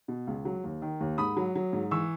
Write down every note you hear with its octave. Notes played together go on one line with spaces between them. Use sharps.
B2
C#2
F#3
D#2
D#3
D#2
G#2 B5 D#6
F#3
F#3
G#2
E3 C#6 E6